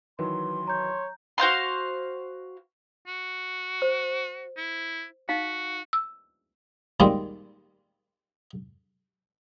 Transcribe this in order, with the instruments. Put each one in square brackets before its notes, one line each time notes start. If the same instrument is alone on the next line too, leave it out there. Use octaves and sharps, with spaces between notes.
[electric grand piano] D#3 E3 F#3 [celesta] B4 [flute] C6
[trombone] C#5 [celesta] A#5 G6
[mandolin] F#4 C5 F5 C6
[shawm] F#4
[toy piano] C5
[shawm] E4
[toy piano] D#4 F5 [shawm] F#4
[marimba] E6
[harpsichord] A#2 D#3 G3 G#3 A#3 C4